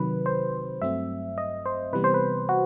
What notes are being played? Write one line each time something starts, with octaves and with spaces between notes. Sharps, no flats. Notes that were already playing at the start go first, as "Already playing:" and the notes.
Already playing: C3 D#3 F#3 B4
C5
G2 F#3 A3 C4 E5
D#5
C5
C3 E3 G3 B3 B4
C5
B4
F#4